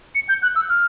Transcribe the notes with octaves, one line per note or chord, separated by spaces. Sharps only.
C#7
G6
F#6
E6
F6